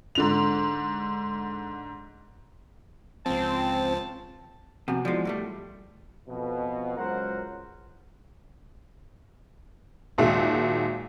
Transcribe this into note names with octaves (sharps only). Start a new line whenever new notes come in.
G#2 D3 F7
C#2 F3 C4 A5
F2 C3 B3 F#4 F#5
F3 G#3 E4 F#4 D5
A2 G3 A3
F2 B2
C#2 F#3 A#4 C5 F#5
D#2 A#2 G#3 F#4 E5